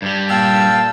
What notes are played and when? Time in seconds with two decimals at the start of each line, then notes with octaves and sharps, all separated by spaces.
0.02 G2 G3
0.29 A#2 F5 G5 A5 E6